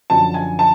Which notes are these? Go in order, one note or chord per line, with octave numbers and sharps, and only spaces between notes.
F#2 D3 F3 A5
G#5
A5